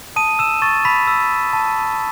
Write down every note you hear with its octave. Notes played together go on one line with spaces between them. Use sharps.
A5 D#6 D#7
E6 E7
C#6 A6
B5 B6
E6
A5